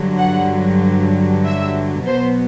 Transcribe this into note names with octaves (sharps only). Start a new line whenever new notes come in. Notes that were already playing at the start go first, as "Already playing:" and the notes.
Already playing: G2 D3 F#3
F#5
E5
B2 F#3 B3 C5